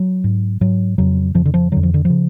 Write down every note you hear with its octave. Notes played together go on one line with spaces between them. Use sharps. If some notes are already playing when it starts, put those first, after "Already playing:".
Already playing: F#3
G#2
G#2 F#3
F2 C#3 F#3
F2 C#3 F3
D3
F3
F2 D3 F#3
F3
D3
C#3 F3